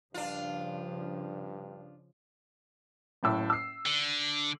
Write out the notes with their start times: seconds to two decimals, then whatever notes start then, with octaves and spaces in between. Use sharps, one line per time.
0.14 G2 C#3 F3 D4 F4
3.23 F#1 A2 E6
3.50 E6 C7
3.86 D3